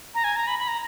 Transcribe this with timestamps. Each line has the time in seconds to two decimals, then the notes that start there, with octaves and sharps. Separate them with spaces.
0.15 A#5
0.24 G#5
0.36 A#5
0.47 B5
0.59 B5
0.68 A#5